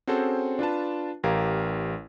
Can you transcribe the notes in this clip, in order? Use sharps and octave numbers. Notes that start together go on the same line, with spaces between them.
C4 C#4 F#4 G#4 A4 C5
D4 F4 B4 A5
A1 G4 A#4 F5 G#6